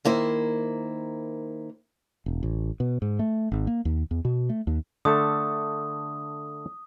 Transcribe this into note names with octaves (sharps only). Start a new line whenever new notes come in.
D#3 A#3 E4 C5
E1
A1
B2
G#2
A3
G#1
A#3
D#2
E2
B2
A3
D#2
D3 A3 A4 D#6